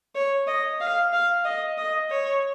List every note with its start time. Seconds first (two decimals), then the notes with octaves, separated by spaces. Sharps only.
0.15 C#5
0.47 D#5
0.80 F5
1.12 F5
1.45 D#5
1.78 D#5
2.10 C#5